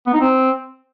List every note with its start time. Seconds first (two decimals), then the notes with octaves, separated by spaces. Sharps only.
0.07 B3
0.14 D#4
0.21 C4